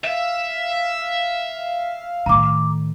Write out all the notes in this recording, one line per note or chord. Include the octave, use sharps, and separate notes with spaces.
E5 F5
A2 D#3 A#5 D6